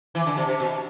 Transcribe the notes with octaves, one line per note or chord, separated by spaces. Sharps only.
E3
D3
C3
C3
B2